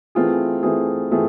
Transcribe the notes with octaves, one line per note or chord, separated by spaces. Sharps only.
E3 A3 C4 F4 G#4
E3 A3 C4 F4 G#4
E3 A3 C4 F4 G#4